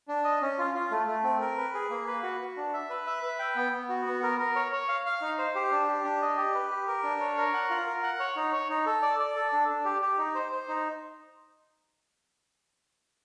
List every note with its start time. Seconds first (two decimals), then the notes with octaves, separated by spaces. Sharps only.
0.08 D4
0.24 D#5
0.42 C#4
0.58 F4
0.75 F4
0.91 A3
1.07 A3
1.24 C4
1.41 A#4
1.58 B4
1.74 G#4
1.90 A#3
2.07 B4
2.23 F#4
2.41 F#4
2.57 D4
2.74 E5
2.90 B4
3.07 E5
3.23 B4
3.39 G5
3.56 B3
3.73 B3
3.89 F#4
4.06 B3
4.23 A#4
4.39 A#4
4.56 C#5
4.72 C#5
4.89 F5
5.05 F5
5.21 D#4
5.38 C5
5.55 G4
5.71 D4
5.88 G4
6.05 D4
6.22 D#5
6.37 G4
6.54 B4
6.71 G4
6.87 A#4
7.04 D4
7.21 C#5
7.37 A#4
7.54 F#5
7.70 F4
7.87 A#4
8.03 F#5
8.20 C#5
8.36 D#4
8.52 C#5
8.70 D#4
8.86 A4
9.02 D5
9.19 D5
9.36 A4
9.53 D4
9.69 D4
9.85 G4
10.02 G4
10.18 D#4
10.35 C5
10.52 C5
10.68 D#4